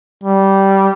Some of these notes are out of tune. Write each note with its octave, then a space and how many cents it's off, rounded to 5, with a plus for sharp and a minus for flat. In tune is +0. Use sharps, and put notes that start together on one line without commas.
G3 -15